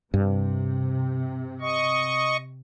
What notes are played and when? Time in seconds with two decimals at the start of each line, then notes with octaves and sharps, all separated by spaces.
0.14 G2 C3
1.61 D#5 C#6